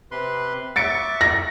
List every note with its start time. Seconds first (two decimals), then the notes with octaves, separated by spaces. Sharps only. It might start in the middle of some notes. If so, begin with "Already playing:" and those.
0.11 C3 B4 C6
0.76 E5 C#6 D6 A6 C#7 D7
1.21 A#6